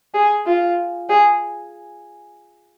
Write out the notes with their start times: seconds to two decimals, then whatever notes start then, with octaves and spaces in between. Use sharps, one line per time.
0.14 G#4
0.46 F4
1.09 G#4